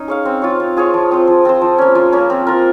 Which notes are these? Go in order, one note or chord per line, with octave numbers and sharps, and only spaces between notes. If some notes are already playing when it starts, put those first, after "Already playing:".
Already playing: C#4 D#4
G#4 C#5 F5
C4
F4 G#4 C#5
C4
F4 G#4 C#5
F3
C4 F4 C5
F3
C4 F4 C5
F3
A#3 C#4
F3
A#3 C#4
C4
F4 A#4